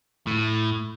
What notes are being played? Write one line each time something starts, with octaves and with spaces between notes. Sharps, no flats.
A2